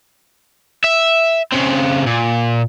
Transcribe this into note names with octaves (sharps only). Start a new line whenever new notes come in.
E5
C#3 C4
A#2